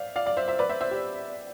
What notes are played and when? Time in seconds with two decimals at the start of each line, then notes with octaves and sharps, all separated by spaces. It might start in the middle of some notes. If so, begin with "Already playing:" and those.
Already playing: C5 D5 E5 F5
0.16 D5 F5
0.26 D5 F5
0.37 C5 E5
0.48 C5 E5
0.59 B4 D5
0.69 C5 E5
0.81 C5 E5
0.91 G4